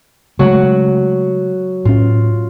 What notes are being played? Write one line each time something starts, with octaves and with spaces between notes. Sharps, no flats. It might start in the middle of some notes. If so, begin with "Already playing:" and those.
C#3 F#3 G#3 A3 F#4
A2 C#4 F4